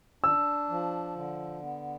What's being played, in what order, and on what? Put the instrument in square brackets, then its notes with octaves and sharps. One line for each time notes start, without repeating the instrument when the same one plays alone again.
[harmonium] D4 [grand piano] E6
[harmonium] F3
D3
B3